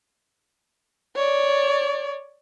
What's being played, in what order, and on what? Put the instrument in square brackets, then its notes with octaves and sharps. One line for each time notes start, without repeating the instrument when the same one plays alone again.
[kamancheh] C#5 D5